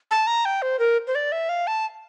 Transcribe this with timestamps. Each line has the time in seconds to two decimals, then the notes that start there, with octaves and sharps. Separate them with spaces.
0.11 A5
0.27 A#5
0.45 G5
0.62 C5
0.79 A#4
1.07 C5
1.15 D5
1.32 E5
1.49 F5
1.67 A5